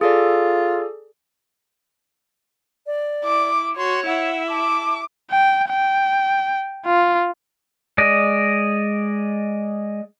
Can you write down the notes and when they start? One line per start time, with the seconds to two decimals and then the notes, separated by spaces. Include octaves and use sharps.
0.01 F4 G#4 A4 D5
2.87 D5
3.24 E4 D6
3.77 F#4 C#5 C6
4.06 E4 E5 F#5
4.49 A5 D6
5.31 G5
5.69 G5
6.86 F4
7.98 G#3 D5 D#5